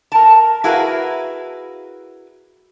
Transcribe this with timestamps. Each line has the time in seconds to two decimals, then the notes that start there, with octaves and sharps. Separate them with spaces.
0.12 A#4 A5
0.64 E4 F#4 G#4 A#4 B4 F5